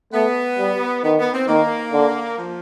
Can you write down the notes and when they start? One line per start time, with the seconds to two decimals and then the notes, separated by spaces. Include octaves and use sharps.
0.13 A3 B3
0.59 G3
1.03 D#3 B3
1.19 B3
1.33 C4
1.48 D#3 A#3
1.93 D3
2.38 F3